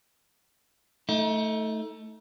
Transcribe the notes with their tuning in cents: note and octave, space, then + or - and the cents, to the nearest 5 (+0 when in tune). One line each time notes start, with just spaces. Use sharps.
A3 +5 D#4 +35